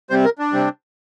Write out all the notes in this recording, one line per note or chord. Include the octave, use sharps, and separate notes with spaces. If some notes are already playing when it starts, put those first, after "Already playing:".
C3 G3 C4 C5
A#4
D4
C3 G3 C4